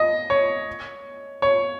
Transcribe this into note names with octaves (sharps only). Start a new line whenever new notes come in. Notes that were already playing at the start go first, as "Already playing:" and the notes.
Already playing: D#5
C#5
C#5